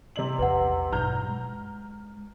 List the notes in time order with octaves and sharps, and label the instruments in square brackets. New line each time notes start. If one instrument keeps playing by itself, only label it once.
[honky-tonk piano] C3 D#5 F#7
[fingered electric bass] A#1 E2 [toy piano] B4 F#5
[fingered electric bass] G2 B2 F#3 [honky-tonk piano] A#5 F6 G6
[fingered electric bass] G#3